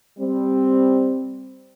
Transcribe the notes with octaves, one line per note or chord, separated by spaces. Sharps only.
G3 C4